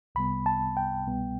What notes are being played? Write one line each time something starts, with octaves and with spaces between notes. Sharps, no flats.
C2 C3 G3 B3 B5
A5
G5
C2 B2 G3 B3